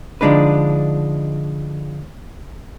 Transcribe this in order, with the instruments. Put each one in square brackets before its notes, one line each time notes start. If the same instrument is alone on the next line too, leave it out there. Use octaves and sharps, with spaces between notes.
[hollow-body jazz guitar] D3 F3 G#3 D4 D#4 B4